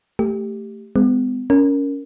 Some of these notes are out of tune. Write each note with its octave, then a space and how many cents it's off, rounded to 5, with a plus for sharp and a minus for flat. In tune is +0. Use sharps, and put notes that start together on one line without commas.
A3 +5 G4 +5
G#3 -20 B3 +40
C#4 +20 A#4 +0